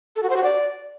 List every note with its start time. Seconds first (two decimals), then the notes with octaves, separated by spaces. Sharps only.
0.16 A4
0.23 F#4
0.30 C5
0.36 F#4
0.43 D5